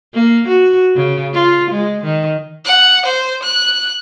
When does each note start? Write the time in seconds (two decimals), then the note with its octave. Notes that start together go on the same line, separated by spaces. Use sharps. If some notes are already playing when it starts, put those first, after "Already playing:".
0.14 A#3
0.48 F#4
0.96 C#3
1.34 F4
1.71 G#3
2.04 D#3
2.65 F#5
3.05 C5
3.43 F#6